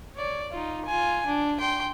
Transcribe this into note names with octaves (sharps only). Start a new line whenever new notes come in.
C#5 D5
D#4 F4
F4 G#5
D4
G5 C6